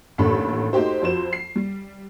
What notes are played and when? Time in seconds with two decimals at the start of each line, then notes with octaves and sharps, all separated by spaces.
0.18 A1 D#2 A2 D3 A4 B5
0.73 A3 D#4 F#4 G4 C5
1.02 F2 F3 F#4 C5 E7
1.33 C7
1.56 G3